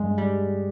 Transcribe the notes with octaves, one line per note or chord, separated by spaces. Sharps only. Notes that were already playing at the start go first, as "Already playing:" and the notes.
Already playing: G2 G#3
G3